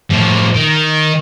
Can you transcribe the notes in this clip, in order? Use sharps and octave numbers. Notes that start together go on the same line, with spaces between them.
A2 F3
D#3